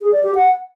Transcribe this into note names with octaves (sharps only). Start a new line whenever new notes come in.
G#4
D5
G4
F#5